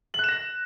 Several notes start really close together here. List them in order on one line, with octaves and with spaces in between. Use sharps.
F#7 F#6 E7 A#6